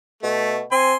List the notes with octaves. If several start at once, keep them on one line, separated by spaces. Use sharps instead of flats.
B2 A3
C4 G#5 C6